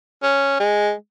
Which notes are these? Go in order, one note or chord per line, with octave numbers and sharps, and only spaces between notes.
C#4
G#3